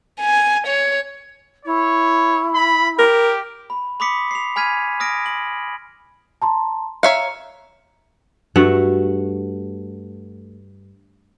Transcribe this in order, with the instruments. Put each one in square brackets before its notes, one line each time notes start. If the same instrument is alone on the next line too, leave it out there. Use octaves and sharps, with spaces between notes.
[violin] G#5
C#5
[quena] E4 [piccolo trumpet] C#5
[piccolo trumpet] B5
[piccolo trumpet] G4 [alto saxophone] A#4
[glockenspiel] B5
B5 C6 D6 D#6 B6 C#7
C7 F7
G#5 B5 F6 G#6 B6 D#7
D#6 F6 A#6 D7
F#7
[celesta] A5 A#5 C6
[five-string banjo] C#5 E5 F5 [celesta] A#5 C#7
[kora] G2 A3 F#4 F#5